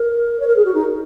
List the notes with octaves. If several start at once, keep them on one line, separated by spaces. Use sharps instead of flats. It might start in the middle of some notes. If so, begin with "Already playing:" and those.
Already playing: A#4
C#5
A#4
G#4
F#4
D#4